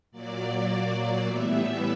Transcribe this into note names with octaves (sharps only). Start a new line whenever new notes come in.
A#2 F#3 A#3 D5
A2 E3 G3 B3 E5